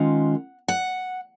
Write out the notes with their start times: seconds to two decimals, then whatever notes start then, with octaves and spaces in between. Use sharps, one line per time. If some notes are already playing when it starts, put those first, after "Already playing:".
Already playing: D#3 G#3 C#4 F4 F#5
0.68 F#5